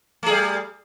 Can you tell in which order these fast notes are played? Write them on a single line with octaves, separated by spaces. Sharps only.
A3 G#4 G3